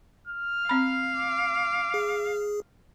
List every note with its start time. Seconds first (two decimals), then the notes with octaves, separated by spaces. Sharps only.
0.28 F6
0.69 C4 F5 B5
1.16 D6
1.94 G#4